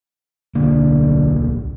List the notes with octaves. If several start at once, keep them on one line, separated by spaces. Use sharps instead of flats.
D1 B1 D3 A#3